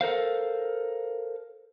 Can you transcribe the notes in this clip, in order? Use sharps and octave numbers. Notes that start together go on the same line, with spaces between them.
A4 A#4 C5 F5